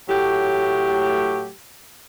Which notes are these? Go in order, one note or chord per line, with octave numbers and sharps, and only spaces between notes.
A2 F#3 A3 G4